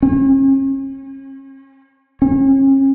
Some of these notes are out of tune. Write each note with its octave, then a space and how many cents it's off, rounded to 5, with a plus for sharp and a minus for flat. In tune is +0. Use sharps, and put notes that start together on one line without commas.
C#4 -40
C#4 -40